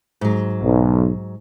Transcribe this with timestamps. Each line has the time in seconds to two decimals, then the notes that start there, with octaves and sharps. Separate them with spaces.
0.21 G#2 F#3
0.62 B1